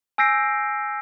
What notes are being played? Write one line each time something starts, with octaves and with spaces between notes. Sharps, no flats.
G#5 E6 G6 A#6 C7 D7